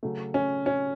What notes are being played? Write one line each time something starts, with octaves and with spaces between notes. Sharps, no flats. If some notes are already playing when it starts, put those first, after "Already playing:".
C#3 F#3 A3
C#4
C#4